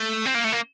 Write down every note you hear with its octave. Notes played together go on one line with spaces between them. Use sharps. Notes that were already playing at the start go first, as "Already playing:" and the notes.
Already playing: A3
C4
A#3
A3
A#3